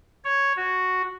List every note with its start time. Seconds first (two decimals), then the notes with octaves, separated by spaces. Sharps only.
0.25 C#5
0.57 F#4